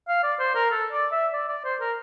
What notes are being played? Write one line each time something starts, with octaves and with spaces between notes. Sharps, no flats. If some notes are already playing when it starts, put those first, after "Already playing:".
F5
D5
C5
A#4
A4
D5
E5
D5
D5
C5
A#4